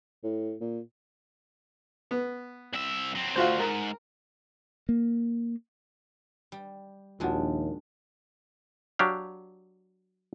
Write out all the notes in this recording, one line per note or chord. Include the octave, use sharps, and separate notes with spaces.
A2
A#2
B3
C2 E5
F#3 C4
D2 F4 F#4 C5
G#2 A#4
A#3
G3
A#1 D#2 D#3 G#3 D4 F4 F#4 F#5
F#3 D4 G4 F5